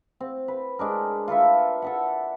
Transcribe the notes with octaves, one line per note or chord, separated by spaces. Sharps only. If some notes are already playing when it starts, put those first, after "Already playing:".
C4
B4
G#3 D4 A#4
F4 A4 B4 E5
A4 E5 F#5